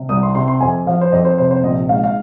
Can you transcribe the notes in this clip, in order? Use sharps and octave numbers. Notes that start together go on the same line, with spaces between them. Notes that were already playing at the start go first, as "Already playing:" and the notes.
Already playing: C3
C2 D#6
C6
C3 C6
C6
F2 G#5
F3 F5
C5
F2 D#5
C5
C3 C5
C5
A#1 D#5
G#2 F5
F5